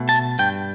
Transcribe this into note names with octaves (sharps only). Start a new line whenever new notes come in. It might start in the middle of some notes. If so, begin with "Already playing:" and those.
Already playing: B2 A3
A5
G2 G5